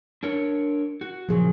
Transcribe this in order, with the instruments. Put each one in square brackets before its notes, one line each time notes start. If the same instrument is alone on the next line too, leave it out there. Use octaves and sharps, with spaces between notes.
[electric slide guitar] D4 A#4 C#5
F#4
[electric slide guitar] A#2 C#3 F#3 [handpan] F3 G#4